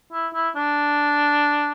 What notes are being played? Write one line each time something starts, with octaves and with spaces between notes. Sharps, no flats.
E4
E4
D4